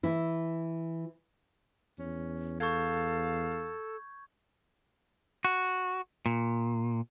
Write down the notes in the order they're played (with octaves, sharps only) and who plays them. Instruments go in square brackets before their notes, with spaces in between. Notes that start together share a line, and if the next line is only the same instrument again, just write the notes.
[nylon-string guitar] E3 E4
[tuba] E2 [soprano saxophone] C#4
[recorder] A4 [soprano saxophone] F5 [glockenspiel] C#6 G6 G#6
[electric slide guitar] F#4
A#2